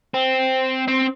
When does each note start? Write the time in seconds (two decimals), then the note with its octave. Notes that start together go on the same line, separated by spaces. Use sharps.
0.14 C4
0.88 C4